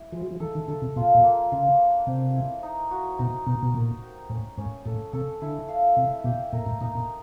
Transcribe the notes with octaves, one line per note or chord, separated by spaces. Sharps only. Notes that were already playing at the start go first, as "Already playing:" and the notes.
Already playing: E4
F3 G#3
F#3
F3
E3 A4
D#3
D3 A4
C3
B2 F4
A#2
A#3
C#3 F4
D4
C3 C4
E4
D#4
F#4
B2 D#4
B2 D#4
B2
A#2 A#4
G4
A2 C#4
G#2 C#4
A2 A4
C3 A4
D3 E4
F5
C3 E5
B2 G4
A#2 A#4
A2
A#2 D#4
A#2